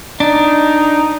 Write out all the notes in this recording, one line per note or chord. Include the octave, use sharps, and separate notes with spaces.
D4 D#4